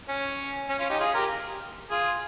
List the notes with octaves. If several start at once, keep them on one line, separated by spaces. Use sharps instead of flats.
C#4
C#4
C#4 F4
D#4 G4
F4 G#4
G4 A#4
F4 G#4